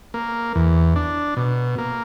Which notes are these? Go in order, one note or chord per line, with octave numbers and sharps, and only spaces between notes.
A#3
E2
D4
B2
A#3